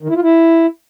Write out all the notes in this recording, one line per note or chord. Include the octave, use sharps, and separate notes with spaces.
D#3
E4
F4
E4